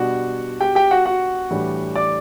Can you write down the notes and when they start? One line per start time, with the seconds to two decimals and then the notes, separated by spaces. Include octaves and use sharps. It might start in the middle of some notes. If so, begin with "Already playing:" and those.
Already playing: B2 G3 D4 F#4 F#5
0.61 G4 G5
0.75 G4 G5
0.91 F#4 F#5
1.05 F#4 F#5
1.50 A2 E3 G3 D4
1.95 D5 D6